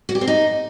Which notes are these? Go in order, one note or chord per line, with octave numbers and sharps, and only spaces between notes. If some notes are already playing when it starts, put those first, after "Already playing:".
F#4
G4
C4
D#4